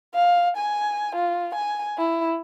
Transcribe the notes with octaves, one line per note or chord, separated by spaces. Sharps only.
F5
G#5
F4
G#5
E4